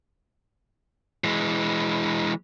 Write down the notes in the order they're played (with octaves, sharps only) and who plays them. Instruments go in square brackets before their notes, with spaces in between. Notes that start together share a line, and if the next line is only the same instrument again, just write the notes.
[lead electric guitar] E3 G#3